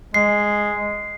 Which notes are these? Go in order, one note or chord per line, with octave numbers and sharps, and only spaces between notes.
G#3 C7